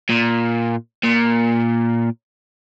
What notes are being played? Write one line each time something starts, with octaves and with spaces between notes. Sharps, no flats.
A#2
A#2